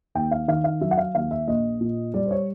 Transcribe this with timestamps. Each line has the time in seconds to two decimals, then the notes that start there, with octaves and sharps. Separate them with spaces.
0.15 D#2 G5
0.31 F5
0.48 D#3 F5
0.64 F5
0.81 F#3 E5
0.91 F#5
0.98 F5
1.15 D#2 F5
1.31 E5
1.47 A#1 D#5
1.81 A#2
2.14 G3 D5
2.26 C5
2.31 C#5